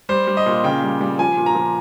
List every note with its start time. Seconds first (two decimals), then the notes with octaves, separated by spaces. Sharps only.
0.09 G3 C5
0.27 G3
0.37 D#5
0.46 A#2
0.64 C#3 G5
0.83 G3
1.01 G3
1.19 F3 G#5
1.37 A#2
1.46 A#5
1.55 F3